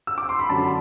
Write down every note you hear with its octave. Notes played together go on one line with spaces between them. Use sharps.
E6
D6
C6
B5
F#2 D3 F#3 A5